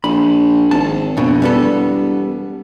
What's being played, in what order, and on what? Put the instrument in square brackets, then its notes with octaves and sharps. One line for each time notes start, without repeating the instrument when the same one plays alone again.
[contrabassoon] A#1 [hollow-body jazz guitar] B5
[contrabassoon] G#1 [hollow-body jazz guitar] A5
[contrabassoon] A#1 [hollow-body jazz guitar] F2 B2
[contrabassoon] E1 [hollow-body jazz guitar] G3 B3 A4